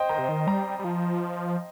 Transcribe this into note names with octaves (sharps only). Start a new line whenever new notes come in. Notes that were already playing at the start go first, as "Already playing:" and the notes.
Already playing: C5 D#5 G5
D#3 A#5
C3
D#3
G3 A#5
G3
F3